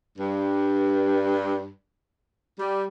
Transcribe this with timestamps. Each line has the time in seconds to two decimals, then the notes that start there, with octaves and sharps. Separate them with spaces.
0.18 G2
2.59 G3